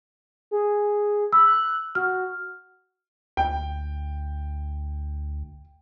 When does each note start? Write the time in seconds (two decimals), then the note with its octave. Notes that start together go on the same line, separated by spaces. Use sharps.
0.51 G#4
1.33 B5 E6
1.46 F#6
1.95 F#4 F6
3.37 D2 G5